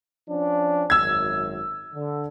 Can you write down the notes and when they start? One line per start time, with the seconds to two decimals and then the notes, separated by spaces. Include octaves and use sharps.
0.28 F3 C#4 D4
0.90 G#1 F#2 E6 G#6
1.94 D3